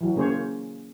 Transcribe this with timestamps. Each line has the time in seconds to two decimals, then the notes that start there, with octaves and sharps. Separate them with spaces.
0.01 E3 F#3
0.16 C#3 A#3 G#4 C5 C#5